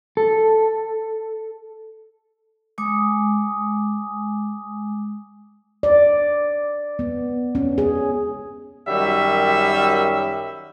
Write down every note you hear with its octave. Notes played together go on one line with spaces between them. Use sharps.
A4
G#3 G#5 D6 D#6
D5
B3
C#4
G#4
F#2 D#3 F#3 G3 E5